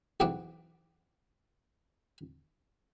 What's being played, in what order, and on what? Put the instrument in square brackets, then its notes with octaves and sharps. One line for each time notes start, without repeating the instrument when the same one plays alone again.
[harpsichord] B1 E2 E3 C4 F#5 D6